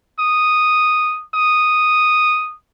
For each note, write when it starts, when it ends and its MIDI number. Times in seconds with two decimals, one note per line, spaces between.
0.20 1.22 87
1.35 2.54 87